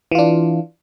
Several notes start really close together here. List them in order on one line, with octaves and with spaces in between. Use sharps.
E3 F4 D4